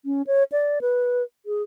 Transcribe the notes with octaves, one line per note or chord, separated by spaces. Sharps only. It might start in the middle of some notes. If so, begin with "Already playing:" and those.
C#4
C#5
D5
B4
G#4